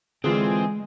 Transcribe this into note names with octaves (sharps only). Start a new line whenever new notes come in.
D3 E3 G#3 C4 F4 G#4